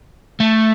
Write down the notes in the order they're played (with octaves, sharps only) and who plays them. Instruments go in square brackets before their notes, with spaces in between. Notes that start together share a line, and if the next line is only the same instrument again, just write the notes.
[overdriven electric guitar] A3